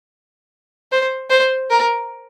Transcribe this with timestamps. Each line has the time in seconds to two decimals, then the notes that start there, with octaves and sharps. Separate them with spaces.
0.92 C5
1.30 C5
1.70 A#4